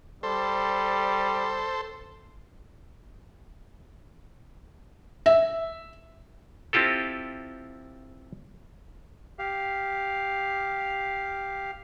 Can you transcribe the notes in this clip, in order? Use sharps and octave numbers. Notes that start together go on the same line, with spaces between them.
G3 A4 C5
E5
C4 E4 F4 G4 A4
G4 F5